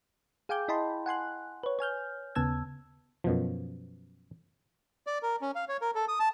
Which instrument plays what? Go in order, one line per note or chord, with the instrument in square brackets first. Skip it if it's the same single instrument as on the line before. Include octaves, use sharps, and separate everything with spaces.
[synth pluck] G#4 F5 G5 G#5 D6 G6
E4 D#5 G5 A5 B5 C6
F#5 G#5 C6 F#6
B4 C#5
C#5 G#5 F6 G6
D#2 C#3 B3 A5 E6 G#6
[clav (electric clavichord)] F#2 B2 F3
[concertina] D5
A#4
C#4
F5
C#5
A#4
A4
D#6
A5